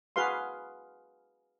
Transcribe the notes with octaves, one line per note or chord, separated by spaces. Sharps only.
F#4 G#4 B4 F5 C6